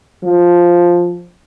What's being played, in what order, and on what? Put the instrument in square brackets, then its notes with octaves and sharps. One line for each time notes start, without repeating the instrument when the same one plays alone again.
[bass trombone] F3